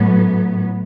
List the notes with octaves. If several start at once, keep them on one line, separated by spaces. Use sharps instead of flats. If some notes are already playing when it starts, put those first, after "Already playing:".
Already playing: A2 F#3 B3